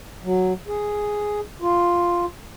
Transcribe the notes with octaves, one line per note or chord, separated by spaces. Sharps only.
F#3
G#4
F4